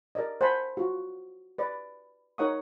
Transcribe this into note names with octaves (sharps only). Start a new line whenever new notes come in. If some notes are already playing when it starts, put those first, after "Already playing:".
A#4 D5 D#5
C5 F#5 G#5 A5 B5
F4 F#4
B4 D5
D#4 A#4 C#5 F#5 C#6 D#6